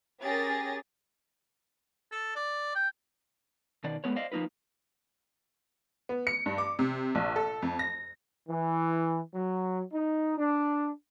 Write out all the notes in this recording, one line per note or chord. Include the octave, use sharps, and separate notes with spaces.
C#4 G4 G#4 A#4 A6 A#6
A4
D5
G5
B2 D#3 D5
G#3 A3 B3 B4 C#5
C5 D5 D#5 F5
F3 A#3 D#4 F4 B4
B3
C#7
G2
D6
C3
A#1
A4
F2
A#6
E3
F#3
D#4
D4